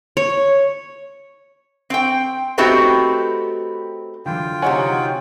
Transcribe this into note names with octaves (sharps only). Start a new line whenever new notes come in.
C#5
C4 G5
A3 B3 C4 D#4 F#4 G4
D3 E3 F#3 F4 G5
C3 D#4 F#4 C#5 F#5 G#5